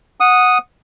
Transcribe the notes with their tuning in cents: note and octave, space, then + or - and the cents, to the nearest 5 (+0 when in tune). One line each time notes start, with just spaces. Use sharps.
F#5 -10 D#6 +0